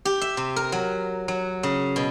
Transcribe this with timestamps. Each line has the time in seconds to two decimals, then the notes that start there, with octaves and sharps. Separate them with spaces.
0.05 G4
0.21 E5
0.37 C3
0.56 A#4
0.72 F#3
1.28 F#3
1.63 C#3
1.96 B2